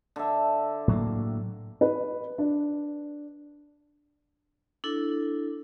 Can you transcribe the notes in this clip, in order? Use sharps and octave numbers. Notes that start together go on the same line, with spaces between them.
D3 E5
A2 F#3 A#3
B4
D4
D4 E4 A4